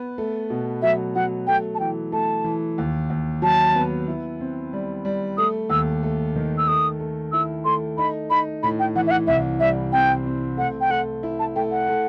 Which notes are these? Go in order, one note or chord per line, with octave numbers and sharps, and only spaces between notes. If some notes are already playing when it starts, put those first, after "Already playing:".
Already playing: B3
A3
B2
F#3 E5
F#3 F#5
A3 G5
A5
E3 G5
A3 A5
E3
D#2
D#2
F#3 A5
B3
E4
C4
G3
G3
A3 D#6
D#2 E6
A3
D#3
E6
A3 D#6
A3
E4 E6
A3 C6
D#4 B5
D#4 B5
A2 B5
G5
E3 F#5
E5
F#5
C2 E5
G3 E5
C4 G5
C4
A3 F#5
G5
A3 F#5
E4
A5
A3 G5
F#5
A3